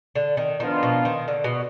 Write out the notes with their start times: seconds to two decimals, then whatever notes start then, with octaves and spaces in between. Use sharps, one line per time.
0.15 D3
0.37 D#3
0.60 D#3 F3 B3 D4 F4 A#4
0.83 B2
1.05 D#3
1.28 D3
1.44 B2